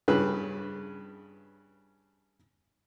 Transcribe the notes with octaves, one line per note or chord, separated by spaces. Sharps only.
G2 C#3 B4